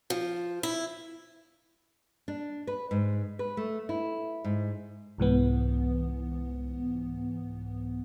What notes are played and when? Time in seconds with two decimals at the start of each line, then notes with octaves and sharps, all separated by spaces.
0.10 F3
0.63 E4
2.28 D4
2.67 B4
2.91 G#2
3.39 B4
3.57 A3
3.89 E4
4.44 G#2
5.18 C2 G#2 E3 B3